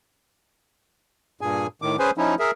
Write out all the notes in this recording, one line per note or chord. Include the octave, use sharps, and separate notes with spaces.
G2 A#2 G#4 G#5
A2 D#3 D6
C#4 G#4 B4 C5 G#5
F3 C#4 D#4 E4
G#4 A#4 E5